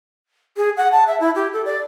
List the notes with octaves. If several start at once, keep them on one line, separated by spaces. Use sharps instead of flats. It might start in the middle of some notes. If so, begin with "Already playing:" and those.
G#4
F#5
A5
E5
E4
G4
A4
D5